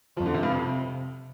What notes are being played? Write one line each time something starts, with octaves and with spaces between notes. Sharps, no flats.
F2 F3
D3
C3
G2
F2 C3